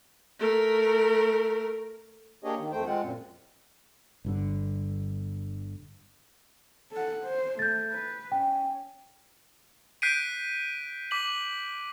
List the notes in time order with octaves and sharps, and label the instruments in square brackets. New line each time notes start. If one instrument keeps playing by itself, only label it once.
[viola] A3 A#4
[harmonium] A#3 D4 G4 G#4 C#5 D#5
D#3
F2 A3 C5 G5
G#3 C4 F4 F#5
F#2 A#2
[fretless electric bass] G1 G2 D3
[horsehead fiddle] A4 F#5
C5
[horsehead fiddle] A3 [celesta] G6 A6
[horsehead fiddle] B4
[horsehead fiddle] C#4 [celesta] G5
[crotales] F#6 G6 B6 C7 D7 D#7
D6 B6 F#7